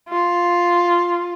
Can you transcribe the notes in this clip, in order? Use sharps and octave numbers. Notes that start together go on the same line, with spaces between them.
F4